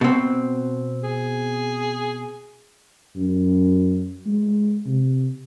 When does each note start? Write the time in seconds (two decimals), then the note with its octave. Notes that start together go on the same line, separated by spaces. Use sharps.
0.01 B2 C4
1.04 G#4
3.16 F#2
4.26 G#3
4.86 C3